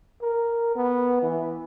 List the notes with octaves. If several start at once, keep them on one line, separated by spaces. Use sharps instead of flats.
A#4
B3
E3